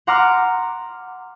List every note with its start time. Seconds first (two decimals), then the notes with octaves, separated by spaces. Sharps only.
0.07 F#5 A#5 C6 D6 F6